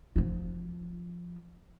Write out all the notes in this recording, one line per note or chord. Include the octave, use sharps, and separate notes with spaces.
F3 F4